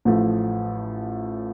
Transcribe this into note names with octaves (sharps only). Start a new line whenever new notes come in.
A1 A2 F3 A3